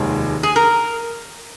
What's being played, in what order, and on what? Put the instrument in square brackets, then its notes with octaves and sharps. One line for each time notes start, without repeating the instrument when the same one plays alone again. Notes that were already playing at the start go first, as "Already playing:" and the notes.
Already playing: [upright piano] F1 D#2 D#3 G#3 D#4
[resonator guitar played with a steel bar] G#4
A#4